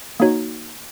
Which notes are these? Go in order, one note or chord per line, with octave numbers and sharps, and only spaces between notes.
A#3 D#4 F#4 C#5